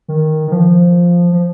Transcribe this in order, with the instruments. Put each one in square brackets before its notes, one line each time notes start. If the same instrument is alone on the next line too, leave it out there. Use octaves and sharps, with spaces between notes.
[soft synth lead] D#3
D#3
F3
F3